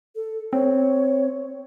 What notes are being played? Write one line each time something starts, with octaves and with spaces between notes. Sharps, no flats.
A4
C4 C#5